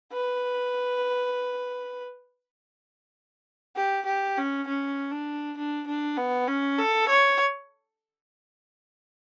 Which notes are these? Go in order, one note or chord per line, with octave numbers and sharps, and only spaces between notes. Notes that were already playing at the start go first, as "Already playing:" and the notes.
B4
G4
G4
C#4
C#4
D4
D4
D4
B3
C#4
A4
C#5